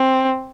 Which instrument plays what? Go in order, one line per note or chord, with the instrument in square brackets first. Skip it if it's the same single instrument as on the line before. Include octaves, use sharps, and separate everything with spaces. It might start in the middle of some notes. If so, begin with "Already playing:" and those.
Already playing: [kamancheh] C4